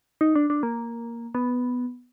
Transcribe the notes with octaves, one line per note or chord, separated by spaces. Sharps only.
D#4
D4
D4
A#3
B3